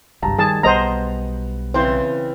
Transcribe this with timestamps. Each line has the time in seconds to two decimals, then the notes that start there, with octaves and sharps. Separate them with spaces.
0.22 G#1 C#2 G2 A5 A#5
0.38 D#3 G3 G#4 A5
0.63 B1 G3 B3 C5 D#5 F#5 A#5
1.74 C#3 E3 C4 C5